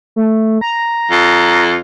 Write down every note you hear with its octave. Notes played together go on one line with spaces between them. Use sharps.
A3
A#5
F2